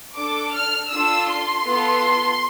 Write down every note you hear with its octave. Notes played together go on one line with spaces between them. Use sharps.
D4 A4 D6
F6
D4 F4 A4 E6
C6
B3 F4 A4